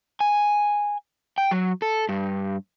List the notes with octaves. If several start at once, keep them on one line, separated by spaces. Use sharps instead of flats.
G#5
G5
F#3
A4
G2